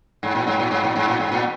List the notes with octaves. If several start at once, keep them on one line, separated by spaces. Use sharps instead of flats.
G#2
A#2
G#2
A#2
G#2
A#2
G#2
A#2
G#2
A#2